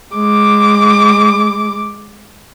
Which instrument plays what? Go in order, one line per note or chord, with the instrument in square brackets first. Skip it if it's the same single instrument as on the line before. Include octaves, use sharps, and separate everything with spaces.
[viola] G#3 D6